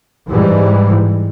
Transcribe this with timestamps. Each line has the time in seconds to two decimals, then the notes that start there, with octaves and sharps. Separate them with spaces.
0.29 G#2 E3 G3